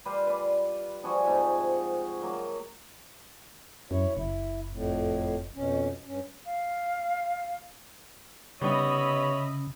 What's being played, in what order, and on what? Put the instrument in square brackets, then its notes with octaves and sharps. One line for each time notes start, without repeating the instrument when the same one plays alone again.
[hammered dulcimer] G3 F4 B4 F5
B4 D5
F3 G3 F#4 G#4
G#2 C3
F#3 A#3
[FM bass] F#2 [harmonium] E4 C#5
[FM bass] F#1 [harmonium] E4
[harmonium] F2 A2
F2 B2 C#4
G2 C#4
[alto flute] F5
[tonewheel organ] C#3 [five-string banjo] G3 B3 D#4 [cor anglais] C#5 [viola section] D#5 E5 B5